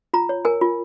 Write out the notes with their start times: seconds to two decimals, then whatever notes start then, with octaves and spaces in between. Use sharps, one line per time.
0.14 F4 A#5
0.29 C#5
0.45 A#4 G#5
0.61 F4